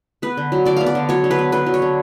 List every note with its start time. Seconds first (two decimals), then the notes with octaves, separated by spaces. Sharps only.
0.22 B3 B4
0.37 D3
0.52 F#3
0.65 D3 D5
0.76 B3 F5
0.86 D5
0.95 D3
1.09 F#3 C#5
1.24 D3
1.31 B4
1.39 B3
1.52 D3 B4
1.66 F#3
1.74 C#5
1.82 D3